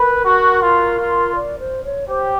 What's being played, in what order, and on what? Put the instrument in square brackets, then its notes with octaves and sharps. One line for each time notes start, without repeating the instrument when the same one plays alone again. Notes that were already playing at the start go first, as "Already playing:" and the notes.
Already playing: [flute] A#4 [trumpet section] B4
[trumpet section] F#4
F4
F4
[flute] D5
C5
C#5
[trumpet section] G4 [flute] C5